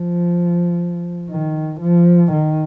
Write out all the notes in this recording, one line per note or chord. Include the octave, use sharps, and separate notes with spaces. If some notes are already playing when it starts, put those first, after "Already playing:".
Already playing: F3
D#3
F3
D#3